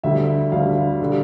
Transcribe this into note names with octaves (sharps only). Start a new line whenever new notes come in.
D2 D3 G3 E5
D2 D3 G3 F5
D3 G3